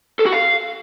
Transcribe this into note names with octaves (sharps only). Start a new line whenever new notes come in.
A4
F#4
F5